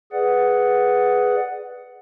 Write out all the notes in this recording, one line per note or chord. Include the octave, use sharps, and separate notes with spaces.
G#4 B4 D5 F#5